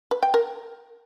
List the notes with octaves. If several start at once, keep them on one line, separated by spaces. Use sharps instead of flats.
B4
G5
A#4